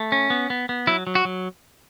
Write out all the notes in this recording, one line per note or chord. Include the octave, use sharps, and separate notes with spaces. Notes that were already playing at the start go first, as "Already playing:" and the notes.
Already playing: A3
C#4
B3
B3
B3
F#3 E4
F#3
F#4
F#3